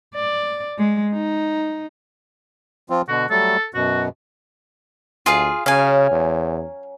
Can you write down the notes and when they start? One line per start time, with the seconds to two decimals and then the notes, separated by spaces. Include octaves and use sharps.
0.15 D5
0.78 G#3
1.13 D#4
2.90 F3 C4 F4
3.08 B2 D3 F#4
3.30 F#3 G3 A3 A4
3.74 F#2 B2 F#4
5.26 D2 F4 G#4 F5
5.66 C#3 F#3 C#4 F5 G#5
6.11 E2